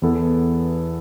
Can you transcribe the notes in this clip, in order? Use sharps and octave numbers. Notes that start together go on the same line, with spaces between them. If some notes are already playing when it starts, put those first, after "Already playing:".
E2 E3 B3 E4 A4